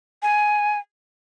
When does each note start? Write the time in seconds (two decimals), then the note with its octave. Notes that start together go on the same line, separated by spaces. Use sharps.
0.23 G#5